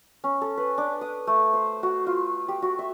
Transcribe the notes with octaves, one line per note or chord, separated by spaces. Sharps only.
C#4
A4
B4
D4
D#6
A3
C5
F#4
F4
G4
F#4
E5